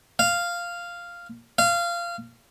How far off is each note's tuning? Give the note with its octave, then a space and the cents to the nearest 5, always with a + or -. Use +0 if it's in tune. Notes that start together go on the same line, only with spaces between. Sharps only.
F5 -5
F5 -20